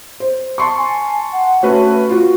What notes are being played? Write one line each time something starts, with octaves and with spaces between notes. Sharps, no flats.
C5
A5 C6 C#6
G#5
F#5
A3 C#4 F#4 B4
F4 F#4